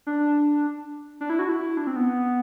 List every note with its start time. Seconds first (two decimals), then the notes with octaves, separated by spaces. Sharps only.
0.07 D4
1.21 D4
1.30 E4
1.39 F#4
1.49 E4
1.77 D4
1.87 C4
1.96 B3